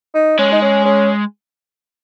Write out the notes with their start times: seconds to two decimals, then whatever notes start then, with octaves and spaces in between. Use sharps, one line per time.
0.15 D#4
0.39 G#3 C#4
0.52 D#4
0.62 C#4
0.85 C#4